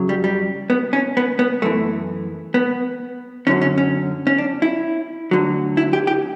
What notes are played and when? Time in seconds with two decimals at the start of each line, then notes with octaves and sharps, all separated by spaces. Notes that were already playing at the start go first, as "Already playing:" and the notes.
Already playing: F#2 C#3 F#3
0.09 G3
0.24 G3
0.70 B3
0.93 C#4
1.17 B3
1.39 B3
1.62 F#2 E3 A3
2.54 B3
3.47 F#2 D3 F#3 C#4
3.62 C#4
3.78 C#4
4.27 C#4
4.38 D4
4.62 E4
5.31 D2 D3 F#3
5.77 E4
5.93 G4
6.07 G4